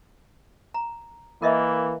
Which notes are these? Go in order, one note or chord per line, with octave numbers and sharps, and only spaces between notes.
A#5
E3 A#3 A#4 D#5 E5